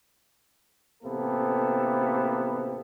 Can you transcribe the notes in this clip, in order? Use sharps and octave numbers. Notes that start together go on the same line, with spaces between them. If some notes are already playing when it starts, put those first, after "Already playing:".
A1 C3 A#3 B3 A4